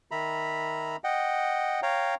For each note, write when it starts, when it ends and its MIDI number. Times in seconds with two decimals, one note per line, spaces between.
0.11 0.96 51
0.11 0.96 76
0.11 0.96 82
0.11 0.96 83
1.04 1.80 75
1.04 1.80 78
1.04 1.80 79
1.83 2.15 73
1.83 2.15 77
1.83 2.15 79
1.83 2.15 82